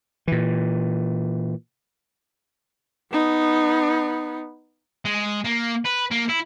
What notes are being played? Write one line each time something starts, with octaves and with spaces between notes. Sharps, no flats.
A#2 E3
B3 D#4
G#3
A#3
B4
A#3
E4